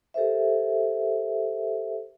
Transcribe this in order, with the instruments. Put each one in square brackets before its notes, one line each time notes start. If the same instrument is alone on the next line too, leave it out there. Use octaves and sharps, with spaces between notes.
[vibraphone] G4 A4 A#4 C5 E5